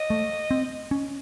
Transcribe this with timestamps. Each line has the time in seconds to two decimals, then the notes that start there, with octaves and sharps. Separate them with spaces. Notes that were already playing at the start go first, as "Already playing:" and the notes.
Already playing: D#5
0.10 A3
0.51 C4
0.91 C#4